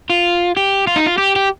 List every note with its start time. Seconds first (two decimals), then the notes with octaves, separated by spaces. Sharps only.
0.10 F4
0.56 G4
0.87 F4
0.96 D#4
1.06 F4
1.18 G4
1.36 G4